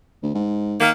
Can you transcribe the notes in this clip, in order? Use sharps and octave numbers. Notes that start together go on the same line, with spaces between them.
D2
G#2
D#3 A#3